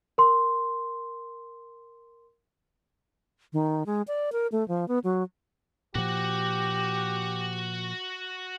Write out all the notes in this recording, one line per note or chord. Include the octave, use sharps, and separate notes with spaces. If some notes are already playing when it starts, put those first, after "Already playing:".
A#4 C6
D#3
G#3
D5
A#4
A3
F3
B3
F#3
A#2 F3 F#4 G4 F#5